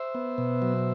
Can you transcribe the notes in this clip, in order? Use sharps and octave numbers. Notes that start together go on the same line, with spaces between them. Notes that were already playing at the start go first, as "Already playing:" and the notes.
Already playing: C5 E5
B3
B2
F#3